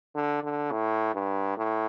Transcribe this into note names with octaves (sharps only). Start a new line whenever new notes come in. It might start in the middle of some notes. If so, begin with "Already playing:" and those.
D3
D3
A2
G2
A2